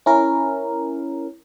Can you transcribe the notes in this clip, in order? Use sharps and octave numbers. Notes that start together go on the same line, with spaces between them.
C#4 E4 A#4